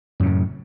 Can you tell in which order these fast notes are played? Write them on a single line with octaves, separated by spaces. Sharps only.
F#2 C#3 A2